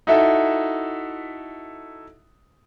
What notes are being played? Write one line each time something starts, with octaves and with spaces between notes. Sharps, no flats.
D#4 E4 F#4 A4 E5